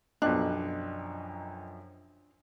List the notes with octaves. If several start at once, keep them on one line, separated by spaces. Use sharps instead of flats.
B1 F#2 F3 D4 D#5 G5 F#6